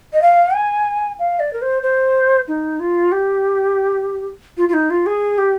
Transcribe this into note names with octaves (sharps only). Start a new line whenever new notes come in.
D#5
F5
G#5
F5
D5
A#4
C5
C5
D#4
F4
G4
F4
F4
D#4
F4
G#4
G4